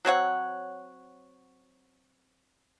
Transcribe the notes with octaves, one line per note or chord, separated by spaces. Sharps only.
F#3 C4 C#5 F#5